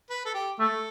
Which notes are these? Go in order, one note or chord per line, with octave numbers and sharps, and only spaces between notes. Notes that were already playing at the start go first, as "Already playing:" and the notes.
B4
A4
G4
A3 A4